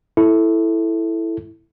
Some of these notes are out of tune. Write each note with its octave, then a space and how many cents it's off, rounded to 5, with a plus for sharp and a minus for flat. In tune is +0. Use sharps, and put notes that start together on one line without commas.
E4 +0 A4 +0